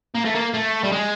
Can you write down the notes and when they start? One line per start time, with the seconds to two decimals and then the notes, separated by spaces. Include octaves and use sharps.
0.15 A#3
0.25 A3
0.35 A#3
0.54 A3
0.84 G3
0.92 G#3